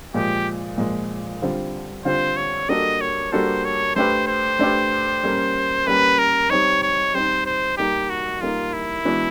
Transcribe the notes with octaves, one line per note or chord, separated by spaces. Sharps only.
A#2 F3 G#3 G4
A#2 F3 G#3
D3 G3 C4 F4
D3 G3 C4 F4 C5
C#5
G3 A#3 D4 F#4 A4 D#5
C#5
G3 A#3 D4 F#4 A4 C5
C#5
A3 D4 G4 B4 C5
C5
A3 D4 G4 B4
G3 A#3 C#4
G3 A#3 C#4 B4
A#4
G3 C4 D#4 C#5
C#5
G3 C4 D#4 C5
C5
G3 A#3 D#4 G4
F#4
G3 A#3 D#4 F4
E4
E3 G#3 B3 D4 F#4